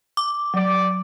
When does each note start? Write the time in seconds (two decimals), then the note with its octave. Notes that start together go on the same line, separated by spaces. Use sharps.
0.17 D6
0.54 F#3 D5